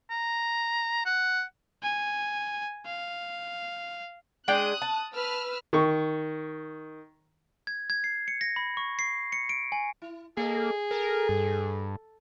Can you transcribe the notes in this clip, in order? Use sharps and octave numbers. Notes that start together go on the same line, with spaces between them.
A#5
F#5
G#5
F5
G#3 D4 G5 D#6 F#6
A5
B4 E6 F6
D#3 C#6
G#6
G#6
C7
C#7
A#6
B5
C#6
C7
C#7
D7
G#5
E4
A#3 G#4 A4 D5 D#5
A4 A#4
G2